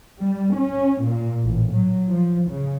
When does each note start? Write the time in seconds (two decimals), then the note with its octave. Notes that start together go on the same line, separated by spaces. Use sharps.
0.21 G3
0.56 C#4
1.04 A#2
1.43 A1
1.72 F#3
2.09 F3
2.49 C#3